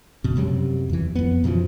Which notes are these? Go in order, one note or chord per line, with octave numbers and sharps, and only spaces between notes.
F2 B2
F#2 C3 F#3 G3
E2 E3
F2 B3
F#2 B2 E3 F3